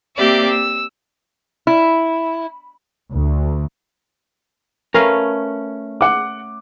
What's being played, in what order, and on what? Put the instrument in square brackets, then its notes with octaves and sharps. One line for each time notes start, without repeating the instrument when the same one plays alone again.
[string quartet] A#3 C4 G4 D5 E5
E6
[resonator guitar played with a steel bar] E4
[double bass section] D2
[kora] A3 C#4 [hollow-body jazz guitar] A#4 B4 F5
[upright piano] F#5 D6